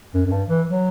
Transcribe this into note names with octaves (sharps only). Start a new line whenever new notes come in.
F#2
F#2
G2
E3
F#3